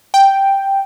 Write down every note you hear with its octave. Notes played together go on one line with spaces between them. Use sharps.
G5